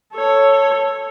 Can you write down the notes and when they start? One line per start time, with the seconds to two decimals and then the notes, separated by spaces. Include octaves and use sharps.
0.14 A4 C#5